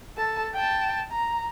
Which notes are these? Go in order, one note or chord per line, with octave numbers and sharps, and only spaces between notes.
A4 A5
G5 A5
A#5